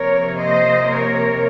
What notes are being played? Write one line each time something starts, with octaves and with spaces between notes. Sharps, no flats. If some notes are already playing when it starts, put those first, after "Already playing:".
Already playing: C3 F3 A#3 A#4 C#5
C5 D#5
A#4 C#5